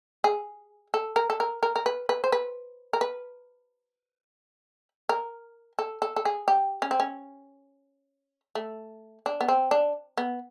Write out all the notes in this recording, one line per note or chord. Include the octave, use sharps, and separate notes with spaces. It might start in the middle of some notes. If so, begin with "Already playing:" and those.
G#4
A4
A#4
A4
A#4
A#4
A#4
B4
B4
C5
B4
A#4
B4
A#4
A4
A4
A4
G#4
G4
C#4
C4
C#4
A3
D4
B3
C4
D4
B3